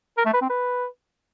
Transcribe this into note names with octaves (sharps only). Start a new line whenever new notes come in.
A#4
A3
B4
C4
B4